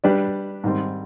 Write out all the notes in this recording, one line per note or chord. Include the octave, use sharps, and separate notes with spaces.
G3 D4 G4 B4 D5
G#2 D#3 G3 C4